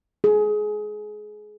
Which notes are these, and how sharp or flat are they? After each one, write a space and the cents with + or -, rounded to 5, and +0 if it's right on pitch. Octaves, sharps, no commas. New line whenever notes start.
G#4 +25